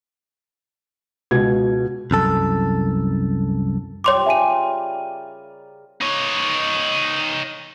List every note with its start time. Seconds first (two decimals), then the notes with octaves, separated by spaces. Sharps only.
1.31 C#2 B2 G#6
2.11 C2 F#2 A4
4.04 G3 F4 C5 C#5 C6 D6
4.26 C#3 G3 A#4 E5 G#5 D#7
6.01 D#4 C#5